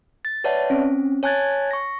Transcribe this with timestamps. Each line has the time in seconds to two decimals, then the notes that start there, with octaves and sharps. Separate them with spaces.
0.25 A6
0.44 B4 C#5 D5 E5 F#5 A5
0.70 C4 C#4
1.23 C#5 G#5 A5 F#6 G#6 A6
1.71 C#6 A#6